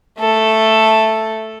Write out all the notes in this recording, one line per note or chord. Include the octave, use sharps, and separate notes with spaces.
A3 A4